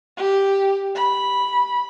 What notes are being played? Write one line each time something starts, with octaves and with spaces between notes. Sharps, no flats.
G4
B5